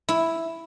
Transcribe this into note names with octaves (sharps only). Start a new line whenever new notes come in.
E4